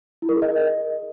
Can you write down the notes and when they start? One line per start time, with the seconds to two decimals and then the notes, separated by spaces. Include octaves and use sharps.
0.22 E4
0.29 A#4
0.35 G#4
0.42 D#5